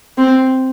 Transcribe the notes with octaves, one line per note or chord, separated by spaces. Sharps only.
C4